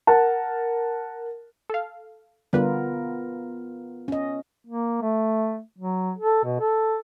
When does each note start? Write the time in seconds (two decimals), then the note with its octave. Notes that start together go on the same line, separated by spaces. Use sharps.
0.07 A#4 F#5 A5
1.70 A4 F5
2.53 D3 G3 B3 F4 A#4 B4
4.08 C#4 D#5
4.67 A#3
5.02 A3
5.78 F#3
6.18 A4
6.44 B2
6.60 A4